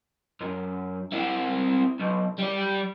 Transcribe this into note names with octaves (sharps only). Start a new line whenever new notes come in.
F#2
C4 E4
B1
G3 D5